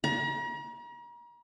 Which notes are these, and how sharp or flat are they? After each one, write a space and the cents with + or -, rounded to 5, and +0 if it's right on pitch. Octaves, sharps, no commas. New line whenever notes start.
A#5 +40